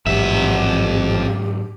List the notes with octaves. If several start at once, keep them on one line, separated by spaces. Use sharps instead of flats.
A1 F2 G#2 F#3 G4 E5